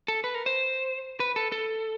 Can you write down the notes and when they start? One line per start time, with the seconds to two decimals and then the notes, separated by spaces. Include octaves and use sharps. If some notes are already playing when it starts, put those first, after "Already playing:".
0.08 A4
0.24 B4
0.35 A#4
0.46 C5
1.20 B4
1.36 A4
1.52 A4